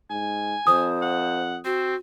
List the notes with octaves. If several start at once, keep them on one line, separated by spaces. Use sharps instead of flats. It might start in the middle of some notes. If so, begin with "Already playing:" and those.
G#2 G#5
F2 C5 D#6
F#5
C4 F#4